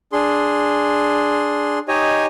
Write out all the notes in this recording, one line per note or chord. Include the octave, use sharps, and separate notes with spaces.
D4 G#4 C6
D#4 G4 C#5 D#5 G#5